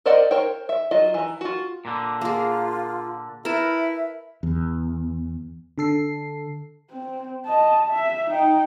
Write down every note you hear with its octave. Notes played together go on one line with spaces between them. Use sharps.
A#4 C5 D5 D#5 F#5
A#4 C5 C#5 G5
E5
F#3 F4 D#5
E3 A#5
F4 F#4
A#2 D3
A#3 F4 G#4
E4 A#4 B4 E5 A5
E2
D3 A4 C7
C4
D#5 A5
E5
D#4 G5